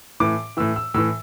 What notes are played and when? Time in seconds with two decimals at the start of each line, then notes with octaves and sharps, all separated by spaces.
0.20 A2 E3 D6
0.57 A2 E3 E6
0.76 E6
0.94 A2 E3 E6